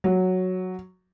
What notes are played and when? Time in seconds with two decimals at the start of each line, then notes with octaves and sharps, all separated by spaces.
0.04 F#3